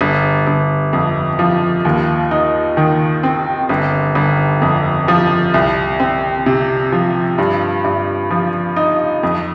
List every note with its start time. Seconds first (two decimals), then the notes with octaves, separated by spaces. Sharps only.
0.01 G1
0.47 G1
0.93 F2
1.39 F3
1.85 D#2
2.31 D#4
2.77 D#3
3.23 C4
3.69 G1
4.15 G1
4.62 F2
5.08 F3
5.54 C2
6.00 C4
6.46 C3
6.92 F3
7.38 G2
7.84 G2
8.31 F3
8.76 D#4
9.23 F2